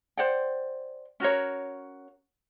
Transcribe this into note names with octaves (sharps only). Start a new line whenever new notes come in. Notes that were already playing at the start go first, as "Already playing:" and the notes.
C5 D5 F#5 G5
C#4 F#4 A#4 C#5